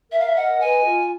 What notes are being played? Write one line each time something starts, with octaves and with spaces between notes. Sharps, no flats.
A#4 E5
F5
E5
D#5 F#5
B4 G#5
F4